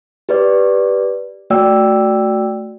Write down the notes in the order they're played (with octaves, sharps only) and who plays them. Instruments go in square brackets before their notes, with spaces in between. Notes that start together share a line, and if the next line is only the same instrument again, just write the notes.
[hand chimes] G4 B4 D5
A3 F#4 D5 G5 E6